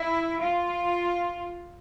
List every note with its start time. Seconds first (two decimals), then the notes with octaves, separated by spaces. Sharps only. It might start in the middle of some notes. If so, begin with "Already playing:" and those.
Already playing: E4
0.42 F4